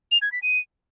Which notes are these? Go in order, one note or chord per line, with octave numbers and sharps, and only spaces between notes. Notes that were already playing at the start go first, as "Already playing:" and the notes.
F7
G#6
B6
D#7